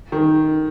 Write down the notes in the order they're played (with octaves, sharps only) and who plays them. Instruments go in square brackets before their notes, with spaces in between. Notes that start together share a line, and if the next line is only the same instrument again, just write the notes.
[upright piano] D#3